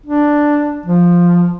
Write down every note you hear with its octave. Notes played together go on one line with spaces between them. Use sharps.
D4
F3